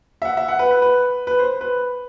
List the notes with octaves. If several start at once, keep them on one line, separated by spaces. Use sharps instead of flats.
E5
F#5
E5
F#5
B4
B4
B4
B4
C5
B4